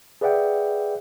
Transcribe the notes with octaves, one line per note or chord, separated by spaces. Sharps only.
G#4 B4 D5 E5 F#5 G5